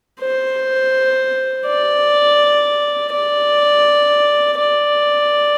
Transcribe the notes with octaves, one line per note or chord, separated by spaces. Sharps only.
C5
D5
D5
D5